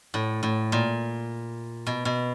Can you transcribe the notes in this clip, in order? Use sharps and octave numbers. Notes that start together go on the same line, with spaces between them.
A2
A2
A#2
B2
B2